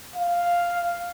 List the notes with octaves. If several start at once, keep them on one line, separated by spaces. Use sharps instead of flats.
F5